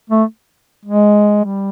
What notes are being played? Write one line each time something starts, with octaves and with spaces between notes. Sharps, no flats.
A3
G#3
G3